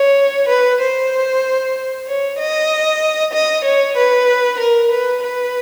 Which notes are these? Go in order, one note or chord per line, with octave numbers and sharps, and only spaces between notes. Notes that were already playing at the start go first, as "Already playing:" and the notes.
Already playing: C#5
B4
C5
C#5
D#5
D#5
C#5
B4
A#4
B4
B4